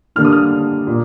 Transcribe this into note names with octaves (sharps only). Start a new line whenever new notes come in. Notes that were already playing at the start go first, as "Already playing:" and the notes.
D3 G3 A#3 D4 F6
D#6
F6
A#2